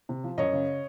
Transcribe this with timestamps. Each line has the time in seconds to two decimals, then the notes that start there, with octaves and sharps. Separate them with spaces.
0.09 C3
0.24 F3
0.38 F#2 C#5 D#5
0.53 C#3